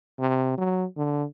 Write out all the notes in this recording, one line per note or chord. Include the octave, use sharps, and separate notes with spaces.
C3
F#3
D3